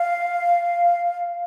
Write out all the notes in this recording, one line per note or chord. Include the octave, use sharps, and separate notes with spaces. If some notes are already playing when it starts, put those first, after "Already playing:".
Already playing: F5